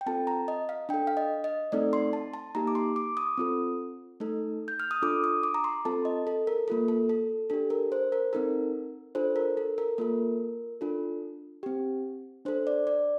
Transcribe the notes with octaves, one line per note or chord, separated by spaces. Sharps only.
G5
C4 F4 A4 A5
A#5
D#5
F5
D4 A4 G5
F5
D#5
D#5
A3 C4 D#4 A4 D5
C6
A5
A5
A#3 D#4 G4 A#5
D6
C6
D6
D#6
C4 F4 A4
A3 D#4 A4
G6
F6
D#6
D4 F4 A4 D6
D#6
D6
A#5
C6
C4 F4 A4 A5
D#5
A4
A#4
A#3 F4 A4
A4
A4
D4 G4 A4
A#4
C5
A#4
C4 D#4 A4 A#4
D4 F4 A4 C5
A#4
A4
A#4
A#3 F4 A4 A#4
D4 F4 A4
C4 G4
D4 A4 C5
D5
D5